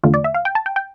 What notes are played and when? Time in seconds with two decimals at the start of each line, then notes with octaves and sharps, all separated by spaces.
0.03 E2 D3 A3 F4
0.14 D5
0.24 E5
0.35 F5
0.45 G5
0.55 A5
0.66 G5
0.76 G5